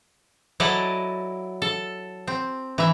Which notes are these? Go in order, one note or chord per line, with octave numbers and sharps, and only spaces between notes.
F#3 E4 A4 D5 D#5
A4
C4
E3 E5